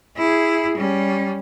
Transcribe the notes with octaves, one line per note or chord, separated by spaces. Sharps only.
E4 G#4
G3 C#4